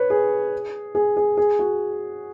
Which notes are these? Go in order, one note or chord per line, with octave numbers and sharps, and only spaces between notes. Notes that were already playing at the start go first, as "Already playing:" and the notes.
Already playing: B4 C#5
G#4
G#4
G#4
G#4
F#4